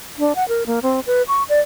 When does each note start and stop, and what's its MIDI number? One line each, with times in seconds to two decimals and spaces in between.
0.19 0.36 62
0.36 0.47 78
0.48 0.64 70
0.67 0.80 58
0.82 1.00 60
1.07 1.22 71
1.28 1.43 85
1.49 1.60 74